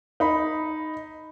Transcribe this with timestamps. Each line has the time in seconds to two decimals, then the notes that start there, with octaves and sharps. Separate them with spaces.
0.20 D#4 B5